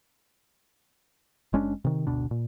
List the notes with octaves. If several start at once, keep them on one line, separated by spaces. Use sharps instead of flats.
F#1 G#3 C#4 D4
C3 D#3
F#1 D2 B2 D4
A#2